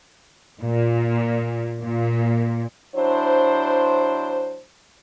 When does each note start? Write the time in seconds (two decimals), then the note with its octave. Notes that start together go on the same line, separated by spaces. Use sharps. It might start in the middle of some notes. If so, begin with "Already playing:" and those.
0.62 A#2
1.80 A#2
2.95 F#3 D4 E4 C5